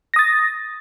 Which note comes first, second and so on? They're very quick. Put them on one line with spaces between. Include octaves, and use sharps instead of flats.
A#6 D#6 A6